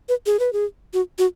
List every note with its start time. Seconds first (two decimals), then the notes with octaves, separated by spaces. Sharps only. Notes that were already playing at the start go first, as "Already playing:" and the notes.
0.09 B4
0.26 G#4
0.39 B4
0.53 G#4
0.93 F#4
1.18 F#4